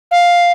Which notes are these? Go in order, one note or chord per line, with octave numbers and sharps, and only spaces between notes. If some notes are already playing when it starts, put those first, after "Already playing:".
F5